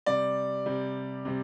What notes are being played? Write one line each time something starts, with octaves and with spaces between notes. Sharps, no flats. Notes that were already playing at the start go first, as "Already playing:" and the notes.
C3 G3 D5
C3 G3
C3 G3